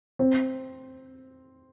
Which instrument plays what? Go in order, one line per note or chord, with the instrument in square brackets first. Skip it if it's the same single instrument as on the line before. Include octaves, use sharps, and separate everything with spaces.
[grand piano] C4